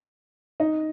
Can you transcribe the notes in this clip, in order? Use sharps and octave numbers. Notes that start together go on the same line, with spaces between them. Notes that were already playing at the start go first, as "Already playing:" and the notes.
D#4